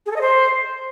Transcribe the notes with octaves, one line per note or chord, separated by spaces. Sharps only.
G#4
A4
D#5
C5